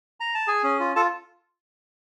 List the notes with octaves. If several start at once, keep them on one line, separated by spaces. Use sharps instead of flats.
A#5
A5
G#4 G#5
C#4
F4
F4 A4 A5